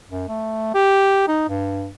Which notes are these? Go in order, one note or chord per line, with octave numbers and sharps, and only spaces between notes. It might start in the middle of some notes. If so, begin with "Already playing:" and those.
F#2
A3
G4
D#4
G2